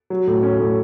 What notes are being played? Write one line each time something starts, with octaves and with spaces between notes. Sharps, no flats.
F#3
A2
C#4
A2